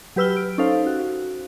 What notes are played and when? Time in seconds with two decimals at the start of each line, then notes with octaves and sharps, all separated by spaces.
0.16 F#3 G4 B4 E6 F6 G7
0.37 D7
0.58 C#4 D#4 A4 C5 F5
0.86 F#4